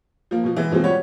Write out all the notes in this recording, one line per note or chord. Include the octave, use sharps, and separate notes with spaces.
F3 A#3
B2 F3
E3 G#3 B3
B2 E3 F3 G#3 C4
F3 G3 B3 F#4 G4 C#5